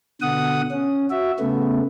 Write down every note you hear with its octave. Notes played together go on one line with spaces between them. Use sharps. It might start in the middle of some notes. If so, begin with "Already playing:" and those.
B2 D3 F#5 D#6
C#4
F#4 E5
C#3 A3 B3